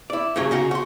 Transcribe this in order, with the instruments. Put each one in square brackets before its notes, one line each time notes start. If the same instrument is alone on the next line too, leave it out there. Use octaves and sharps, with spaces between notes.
[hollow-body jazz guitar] E4 D5
G2 A#2 C#3 F#3 A#3
C#3 D#4 F#4
F#4 C6